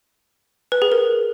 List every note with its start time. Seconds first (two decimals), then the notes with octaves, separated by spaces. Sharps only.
0.72 B4
0.82 G#4
0.92 A#4